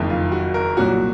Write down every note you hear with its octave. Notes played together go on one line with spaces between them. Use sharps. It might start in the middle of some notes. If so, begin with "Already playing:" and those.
Already playing: F#1 F2 D#3
F4
F#4
A#4
C2 A#2 F#3 F#4